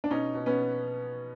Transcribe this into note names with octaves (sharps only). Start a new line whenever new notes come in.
D4
B2 C#4 D#4
B2
B3 C#4